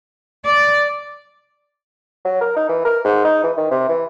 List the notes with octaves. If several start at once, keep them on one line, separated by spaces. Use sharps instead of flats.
D5
F#3
A#4
D#4
E3
A#4
G#2
D#4
E3
D#3
C3
E3